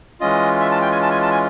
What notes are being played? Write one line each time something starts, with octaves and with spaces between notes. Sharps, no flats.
E3 G#3 C#4 F4 D#5
E5
A5
G5
G#5
A5
G#5
A5
G#5